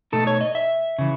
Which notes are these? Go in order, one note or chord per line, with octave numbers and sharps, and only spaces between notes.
B2 A3 D#4 A4
C#5
D#5
E5
C#3 E3